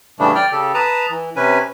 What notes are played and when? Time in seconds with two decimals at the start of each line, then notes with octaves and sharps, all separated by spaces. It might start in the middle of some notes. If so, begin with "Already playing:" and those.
0.19 A2 C#3 E3 G3 A3 D4
0.35 D5 G5 F6
0.52 C#3 G4 A4
0.74 B4 A5 A#5 D#6
1.10 E3
1.36 C3 C#4 B4 G#5